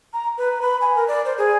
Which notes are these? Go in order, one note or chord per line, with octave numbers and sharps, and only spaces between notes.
A#5
B4
B5
G#5
A#4
D5
C5
G#4